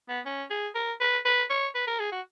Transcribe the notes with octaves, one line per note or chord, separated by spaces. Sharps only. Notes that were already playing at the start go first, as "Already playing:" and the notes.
B3
C#4
G#4
A#4
B4
B4
C#5
B4
A#4
G#4
F#4